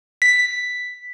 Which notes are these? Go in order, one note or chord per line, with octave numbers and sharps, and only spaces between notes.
B6